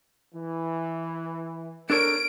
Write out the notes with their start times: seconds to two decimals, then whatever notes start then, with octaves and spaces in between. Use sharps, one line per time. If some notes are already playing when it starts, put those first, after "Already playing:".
0.35 E3
1.90 D4 A4 A#4 C#5 D7